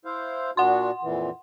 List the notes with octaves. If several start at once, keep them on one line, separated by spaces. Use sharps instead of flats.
E4 C5 F5
A#2 D4 F#4 F#5 C6
F2 A#2 E3